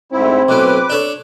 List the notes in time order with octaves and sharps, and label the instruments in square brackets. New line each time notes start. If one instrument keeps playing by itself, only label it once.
[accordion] D2 G#2 E4 [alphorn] C4
[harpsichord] B1 A2 C#4 [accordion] B4 D6
[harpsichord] D4 A4 C#5